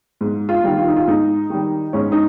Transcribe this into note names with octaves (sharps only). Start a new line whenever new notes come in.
G#2
F4
D#3 G3
F4
D#4
F4
G#2 D#4
D#3 G3
G#2 C#4
D#4